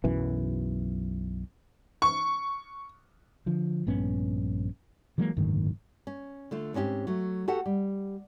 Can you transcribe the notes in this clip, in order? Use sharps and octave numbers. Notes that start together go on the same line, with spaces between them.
B1 F#2 E3
C#6
D3 F3
A#1 G2 B3 C#4
E3 F#3 G#3 A#3
F#1 D2 G#2 D#3
C#4
D3 A3 F4
G#2 C4 C#4 E4 G4
F#3 A3
F#4 G4 A4 F#5
G3